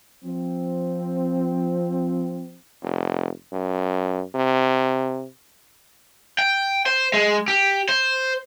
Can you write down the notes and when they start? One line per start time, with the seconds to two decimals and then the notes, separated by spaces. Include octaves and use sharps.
0.24 F3 C4
2.83 F1
3.53 F#2
4.35 C3
6.39 G5
6.86 C5
7.14 G#3
7.48 G4
7.89 C5